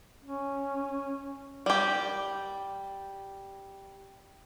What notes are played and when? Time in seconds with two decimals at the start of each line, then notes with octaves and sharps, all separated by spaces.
0.24 C#4
1.66 G3 G4